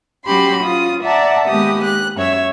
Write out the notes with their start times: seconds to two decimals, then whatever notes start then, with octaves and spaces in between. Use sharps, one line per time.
0.25 F#3 C#4 G4 B5 C6
0.63 C#4 F4 D#6
1.02 D5 E5 F#5 A5 A#5
1.47 D#2 G#3 B3 G4 D#6
1.84 F#6
2.16 F#2 C#5 E5 E6